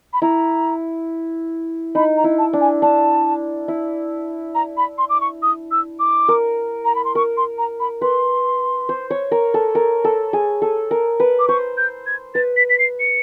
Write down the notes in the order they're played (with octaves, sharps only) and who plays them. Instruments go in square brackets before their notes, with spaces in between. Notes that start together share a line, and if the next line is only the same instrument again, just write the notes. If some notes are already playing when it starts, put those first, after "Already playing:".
[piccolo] B5
[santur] E4 [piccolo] A#5
[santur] D#4 [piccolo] B5
[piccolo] A#5
[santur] E4
[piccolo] A5
[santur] D4
[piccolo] G#5
[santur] D4 [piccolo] A5
[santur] E4
[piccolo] A#5
B5
C6
D6
C#6
D#6
E6
D6
[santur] A#4
[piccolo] A#5
B5
C6
[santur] A#4 [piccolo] C#6
[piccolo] C6
A#5
B5
[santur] B4 [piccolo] C6
[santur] C5
C#5
A#4
A4
A#4
A4
G#4
A4
A#4
B4
[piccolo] D6
[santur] C5 [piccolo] C#6
[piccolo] G6
G#6
[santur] B4 [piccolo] A6
[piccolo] B6
B6
C7
C#7